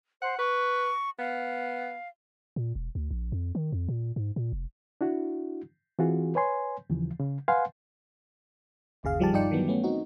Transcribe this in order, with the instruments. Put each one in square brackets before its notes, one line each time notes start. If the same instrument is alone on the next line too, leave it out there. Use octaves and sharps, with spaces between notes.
[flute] C5 [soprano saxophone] F#5
[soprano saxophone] B4 [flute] C#6
[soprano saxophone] B3 [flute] F5
[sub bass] A#2
E1
D2
A#1
F2
D#3
F2
A#2
G#2
A#2
F1
[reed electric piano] D4 E4 F#4
E3 C4 F4 F#4 G#4
B4 C#5 G#5 C6
D#2 C#3 E3 F3
C#3
B4 F5 F#5 G#5 C6
[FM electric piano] G1 D#2 C#3 G#4 F5
D#3 F3 G3 G4 G#4 A5
G2 D#4 F4 D5 G5 C#7
D#3 E3 F#3 G3 B3
A3 B3 C#4
C4 D#4 F#4